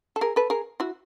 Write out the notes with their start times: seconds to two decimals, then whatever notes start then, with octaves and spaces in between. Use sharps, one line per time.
0.16 A4
0.21 G#4 A#4
0.36 A4 B4
0.50 G#4 A#4
0.80 E4 F#4